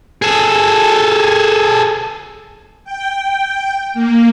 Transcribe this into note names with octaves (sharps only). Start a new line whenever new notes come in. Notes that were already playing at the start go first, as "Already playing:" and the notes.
G#4 A4
G5
A#3